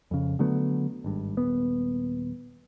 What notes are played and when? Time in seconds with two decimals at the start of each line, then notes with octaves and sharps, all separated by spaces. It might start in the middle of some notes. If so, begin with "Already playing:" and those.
0.11 F2 C#3
0.39 D3 F#3 A3 B3
1.04 G#1 G2
1.37 D#1 B3